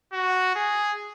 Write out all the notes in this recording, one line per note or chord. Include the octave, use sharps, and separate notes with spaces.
F#4
G#4